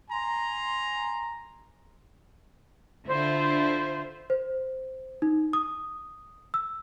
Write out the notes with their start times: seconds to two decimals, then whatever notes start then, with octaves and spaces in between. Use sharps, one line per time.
0.11 G#5 A#5 C6
3.08 D3 E4 F4 C5
4.30 C5
5.22 D#4
5.53 D#6
6.54 E6